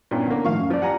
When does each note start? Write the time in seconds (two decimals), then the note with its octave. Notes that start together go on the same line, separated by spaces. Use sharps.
0.11 G2 A#2 B3 C#4 E4
0.27 D3 A#3
0.45 A2 D#3 F3 F5 C#6
0.57 F#2
0.70 E3 F3 F4 D5
0.82 G4 F#5 G#5 A#5